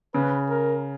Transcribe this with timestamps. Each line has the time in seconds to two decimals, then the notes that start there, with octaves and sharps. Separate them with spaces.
0.14 C#3 B4
0.49 A#4